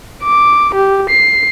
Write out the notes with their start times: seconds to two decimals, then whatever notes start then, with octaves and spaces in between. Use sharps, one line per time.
0.24 D6
0.75 G4
1.10 C7